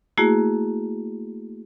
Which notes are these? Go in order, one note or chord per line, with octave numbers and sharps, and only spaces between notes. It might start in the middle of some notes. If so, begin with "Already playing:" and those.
A3 A#3 E4 F#4 G#4